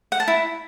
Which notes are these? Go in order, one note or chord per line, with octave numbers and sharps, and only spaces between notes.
F#5
A5
E4